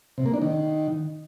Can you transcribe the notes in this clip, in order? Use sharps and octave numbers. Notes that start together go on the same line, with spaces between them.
C3
A#3
D4
D#3